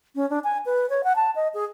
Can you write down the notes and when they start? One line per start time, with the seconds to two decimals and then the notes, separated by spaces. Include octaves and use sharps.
0.15 C#4
0.30 D4
0.44 G#5
0.65 B4
0.90 C#5
1.04 F#5
1.16 A5
1.35 D#5
1.54 G#4